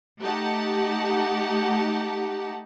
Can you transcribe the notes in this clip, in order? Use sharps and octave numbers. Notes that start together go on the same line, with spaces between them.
A3 D#4 G4 F#5 A5